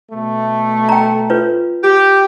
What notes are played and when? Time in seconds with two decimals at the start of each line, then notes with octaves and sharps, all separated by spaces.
0.12 B2 A3
0.89 G5 A#5
1.30 F4 B4 C#5
1.83 G4